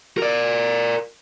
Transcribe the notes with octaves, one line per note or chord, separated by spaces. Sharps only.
A#4 D5